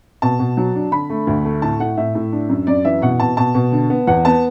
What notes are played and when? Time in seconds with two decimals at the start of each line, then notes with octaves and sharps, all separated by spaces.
0.22 B2 A5
0.39 B2
0.57 F#3
0.75 D4
0.92 D3 B5
1.10 A3
1.27 D2
1.45 A3
1.62 A2 A5
1.80 A2 F#5
1.97 A2 E5
2.15 A2
2.32 D4
2.49 F#2
2.67 F#2 D5
2.85 E3 E5
3.02 B2 F#5
3.20 B2 A5
3.37 B2 A5
3.55 B2
3.72 D3
3.90 B3
4.07 E2 F#5
4.25 B3 A5